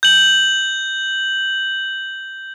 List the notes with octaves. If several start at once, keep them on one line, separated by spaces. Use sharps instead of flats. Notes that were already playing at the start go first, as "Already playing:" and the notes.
G6 F#7